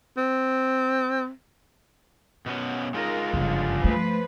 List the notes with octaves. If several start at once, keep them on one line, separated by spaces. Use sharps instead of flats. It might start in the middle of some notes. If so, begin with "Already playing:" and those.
C4
B2 B3 C#4
G#3 D#4 F4 A#4
F#1 G2 D3 F3
F3 A3 B4 C5